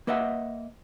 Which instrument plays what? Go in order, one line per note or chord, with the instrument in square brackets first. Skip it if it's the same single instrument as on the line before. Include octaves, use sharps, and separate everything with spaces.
[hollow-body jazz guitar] A#3 B4 D#5 E5 F#5